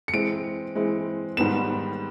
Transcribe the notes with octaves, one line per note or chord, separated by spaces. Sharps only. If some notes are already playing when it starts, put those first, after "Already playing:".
C#7
E3 G#3 C4 D7
E3 G#3 C4
G#2 D#3 G3 B3 E7